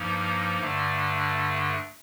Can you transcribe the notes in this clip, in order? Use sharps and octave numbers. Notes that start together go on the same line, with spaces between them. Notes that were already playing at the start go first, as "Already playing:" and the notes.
Already playing: G2 F3 A#3 D#4
G2 D3 A3 D4